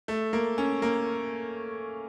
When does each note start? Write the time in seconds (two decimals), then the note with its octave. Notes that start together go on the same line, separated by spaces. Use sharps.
0.08 A3
0.33 A#3
0.58 C#4
0.82 A#3